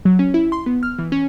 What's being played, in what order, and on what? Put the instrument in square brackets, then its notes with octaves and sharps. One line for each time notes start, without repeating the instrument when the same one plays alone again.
[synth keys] F#3
C#4
E4
C6
B3
F6
E3
C#4